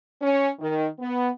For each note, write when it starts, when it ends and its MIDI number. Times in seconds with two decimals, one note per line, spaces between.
0.22 0.48 61
0.59 0.87 51
0.99 1.29 59